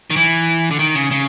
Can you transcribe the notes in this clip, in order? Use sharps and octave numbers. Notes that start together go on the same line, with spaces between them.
D#3
E3
D3
D#3
C#3
C#3